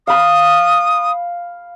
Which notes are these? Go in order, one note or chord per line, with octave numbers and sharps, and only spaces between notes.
F5 B5 D#6